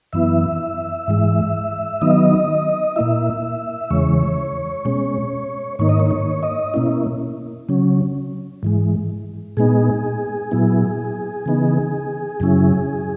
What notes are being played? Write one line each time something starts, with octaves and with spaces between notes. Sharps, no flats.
F#2 E3 B3 E4 E5
G#2 E3 G#3
D#3 F#3 B3 D#4 D#5
A#2 A#3 E4 E5
E2 C#3 E3 G#3 C#5
B2 G#3 C#4
G#2 D#3 A#3 D#4 C#5
D#5
C#5
C#5
D#5
B2 A#3 C#4 E4
C#3 F#3 C#4
G#2 E3 G#3
A#2 G#3 B3 D#4 G#4
A#2 F#3 B3 E4
C#3 E3 B3 D#4
F#2 C#3 F#3 C#4 E4